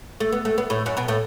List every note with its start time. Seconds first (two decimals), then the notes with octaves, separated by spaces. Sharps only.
0.20 A3
0.32 B3
0.45 A3
0.58 B3
0.70 A2 A3
0.86 F#2 F#3
0.97 B2 B3
1.08 A2 A3